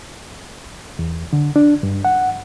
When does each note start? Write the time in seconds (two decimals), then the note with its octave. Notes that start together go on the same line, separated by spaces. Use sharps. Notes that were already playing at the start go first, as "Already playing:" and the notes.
0.99 E2
1.33 D3
1.56 D4
1.83 G2
2.05 F#5